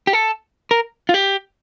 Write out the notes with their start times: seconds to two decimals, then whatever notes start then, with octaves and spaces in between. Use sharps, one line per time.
0.07 G4
0.13 A4
0.71 A#4
1.09 F4
1.14 G4